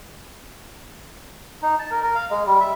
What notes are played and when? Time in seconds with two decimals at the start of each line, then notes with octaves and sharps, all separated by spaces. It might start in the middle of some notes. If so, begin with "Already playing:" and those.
1.62 D#4
1.79 A5
1.91 A#4
2.02 A#4
2.15 F5
2.30 G#3
2.46 G3
2.60 E5